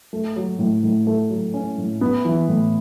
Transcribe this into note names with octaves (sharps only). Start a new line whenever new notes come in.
A3
F#3
A2
A2
A3
F#3
C#4
A2
B3
E3
A2